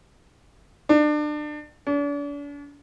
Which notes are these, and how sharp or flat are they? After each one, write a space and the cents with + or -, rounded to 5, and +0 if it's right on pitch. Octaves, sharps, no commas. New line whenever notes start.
D4 +30
D4 -40